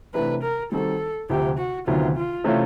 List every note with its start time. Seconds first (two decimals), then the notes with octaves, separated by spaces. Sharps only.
0.14 C3 E3 A3 D4 B4
0.43 A#4
0.71 D#3 G3 C4 D#4 F#4 A4
1.29 D2 C3 F3 G4
1.59 F#4
1.87 D2 C3 D#3 F#3 B3 F4
2.17 F4
2.44 C3 E3 A3 C#4 F4